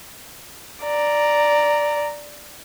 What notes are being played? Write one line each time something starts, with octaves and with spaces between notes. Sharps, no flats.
D5 A#5